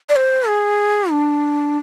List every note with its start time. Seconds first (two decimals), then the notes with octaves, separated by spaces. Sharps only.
0.09 D5
0.16 C5
0.48 G#4
1.11 D4